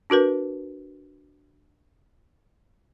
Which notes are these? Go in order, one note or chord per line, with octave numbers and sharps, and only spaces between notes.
D4 F#4 A#4 B4